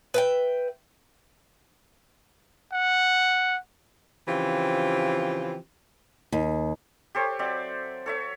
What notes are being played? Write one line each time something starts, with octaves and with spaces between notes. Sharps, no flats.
B4 E5 G5
F#5
C#3 E3 F3 C4 F4 G4
D#2
G4 A4 C5 C#5
F#3 C4 D5 E5
A4 C#5 E5